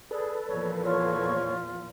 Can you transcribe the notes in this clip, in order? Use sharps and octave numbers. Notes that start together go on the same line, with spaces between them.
G#4 A4 B4 D5
E2 A#2 F3 C#5
F4 C#5 C#6